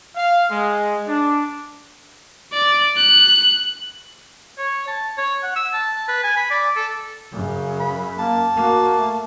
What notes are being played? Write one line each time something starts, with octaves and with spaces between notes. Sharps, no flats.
F5
G#3
D4
D5
F#6
C#5
A5
C#5
F#5
E6
A5
B4
G#5
B5
D5
A4
F#2 C#3
B5
A#3 A5
A#3 F#4
A3